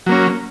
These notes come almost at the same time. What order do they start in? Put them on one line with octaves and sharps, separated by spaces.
F#3 A#3 C#4